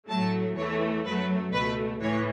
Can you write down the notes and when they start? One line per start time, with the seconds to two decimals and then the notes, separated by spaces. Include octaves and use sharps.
0.09 A2 F#3 A3 A5
0.56 E2 E3 A3 C#5
1.05 F#2 F#3 A3 B4
1.53 C#2 B2 A3 B4
2.01 A2 E3 C#5